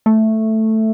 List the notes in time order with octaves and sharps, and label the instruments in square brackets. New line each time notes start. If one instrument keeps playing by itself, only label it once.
[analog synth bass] A3